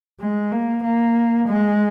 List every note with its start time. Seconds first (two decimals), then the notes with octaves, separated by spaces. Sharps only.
0.21 G#3
0.52 A#3
0.84 A#3
1.48 G#3